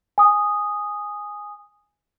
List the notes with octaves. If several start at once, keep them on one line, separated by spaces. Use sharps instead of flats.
G#5 D#6